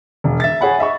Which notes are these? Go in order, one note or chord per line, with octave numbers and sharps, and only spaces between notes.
E1
E5 A6
G#4 C#5 F#5 B5
D#5 E5 B5 C#6